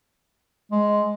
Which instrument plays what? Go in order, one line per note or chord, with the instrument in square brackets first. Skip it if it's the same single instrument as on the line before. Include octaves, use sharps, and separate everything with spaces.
[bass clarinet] G#3